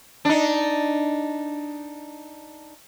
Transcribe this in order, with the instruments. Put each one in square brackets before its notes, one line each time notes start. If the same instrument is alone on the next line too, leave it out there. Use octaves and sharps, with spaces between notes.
[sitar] D4 D#4